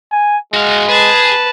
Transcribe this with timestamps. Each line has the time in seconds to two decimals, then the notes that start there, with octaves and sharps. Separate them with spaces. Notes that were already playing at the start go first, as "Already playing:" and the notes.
0.12 G#5
0.54 G#3 F#4 F5
0.89 G#4 B4 A5